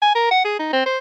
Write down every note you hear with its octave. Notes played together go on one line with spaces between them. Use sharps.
G#5
A#4
F#5
G#4
D#4
C4
C5